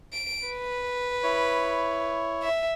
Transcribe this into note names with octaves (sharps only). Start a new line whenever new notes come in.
D7
B4
E4 C#5
E5